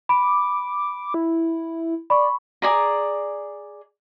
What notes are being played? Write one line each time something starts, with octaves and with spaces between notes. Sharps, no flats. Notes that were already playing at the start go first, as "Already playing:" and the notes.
B5 D6
E4
D5 B5 C#6
G#4 D5 A#5